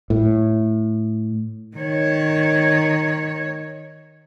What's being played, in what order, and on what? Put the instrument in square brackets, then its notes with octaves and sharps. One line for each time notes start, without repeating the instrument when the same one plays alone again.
[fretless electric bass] A2
[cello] D#3 C#5